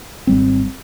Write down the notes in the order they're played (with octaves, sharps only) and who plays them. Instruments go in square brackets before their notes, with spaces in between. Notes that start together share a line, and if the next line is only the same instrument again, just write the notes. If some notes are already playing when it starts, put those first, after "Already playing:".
[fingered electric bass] G#1 G3 C4